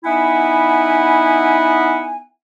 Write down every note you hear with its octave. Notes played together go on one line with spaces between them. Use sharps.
B3 D#4 E4 E5 F#5 G#5